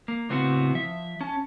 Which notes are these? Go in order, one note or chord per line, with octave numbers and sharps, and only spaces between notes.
A#3
A2 C#3 B3 C4 E4 F#4
F3 E5
C#4 A5